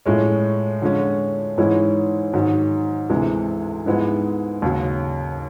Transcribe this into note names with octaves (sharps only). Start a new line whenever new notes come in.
A2 F3 G#3 C#4
D3 F3 G#3 C#4
G#2 E3 G#3 C#4 E4
G#2 D#3 F#3
D2 C3 E3 G#3
G#2 F3 G#3 B3 E4
D#2 C#3 F#3